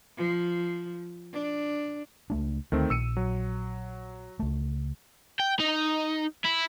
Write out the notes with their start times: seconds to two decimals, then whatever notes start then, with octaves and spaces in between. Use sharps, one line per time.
0.17 F3
1.33 D4
2.30 C#2 A3 D4
2.72 D2 D#3 A3 C4
2.90 A#1 E6 C#7 D#7
3.17 F#3
4.39 C#2 A3
5.40 G5
5.60 D#4
6.45 E4